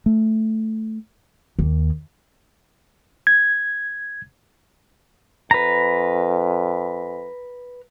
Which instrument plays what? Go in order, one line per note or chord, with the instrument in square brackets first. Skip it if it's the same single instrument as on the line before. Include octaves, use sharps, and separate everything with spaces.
[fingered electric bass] A3
[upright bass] D#2
[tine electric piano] G#6
[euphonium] F2 [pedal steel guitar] B4 A#5